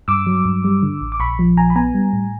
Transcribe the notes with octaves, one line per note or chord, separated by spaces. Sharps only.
G2 D6 E6
F#3
G2
G3
D3
A1
D6
A#1 B5 C#6
F3
A#1 G#5 A#5
B5
B3 G#5 A#5
G3
A2